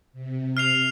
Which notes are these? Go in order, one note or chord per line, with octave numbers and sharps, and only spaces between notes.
C3
F6 C7 F7